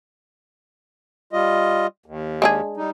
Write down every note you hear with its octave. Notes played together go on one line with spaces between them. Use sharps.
G3 F4 D#5
D#2
G#3 D4 G#4
G3 D#4